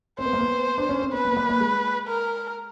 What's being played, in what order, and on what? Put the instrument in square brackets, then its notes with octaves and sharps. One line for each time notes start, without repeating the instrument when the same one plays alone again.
[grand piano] C4 [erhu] C5
[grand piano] B3
A#3
B3
D4
C#4
C4
[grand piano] B3 [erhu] B4
[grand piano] A#3
B3
A#3
A#3
G#3
[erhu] A#4